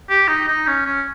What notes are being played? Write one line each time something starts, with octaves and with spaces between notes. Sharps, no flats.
G4
D#4
D#4
C#4
C#4